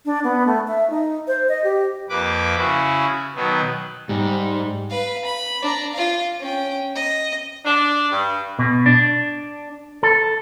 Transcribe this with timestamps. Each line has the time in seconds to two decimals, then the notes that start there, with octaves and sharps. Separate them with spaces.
0.05 D4
0.24 B3
0.47 A3
0.68 E5
0.90 D#4
1.27 C5
1.48 D#5
1.64 G4
2.09 F2 A#3 B4 D6
2.57 C#3 E4 F#4
3.35 B2 D#3 F#3 B3
4.09 G#2 G3
4.90 B4 F5
5.25 B5
5.62 D4 A#5
5.93 F4 F5
6.40 C#4 G5
6.95 D#5
7.65 D4
8.11 G2
8.59 B2
8.86 D4
10.03 A4